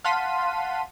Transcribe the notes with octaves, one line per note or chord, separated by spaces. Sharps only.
F5 F#5 A5 C6 B6 D#7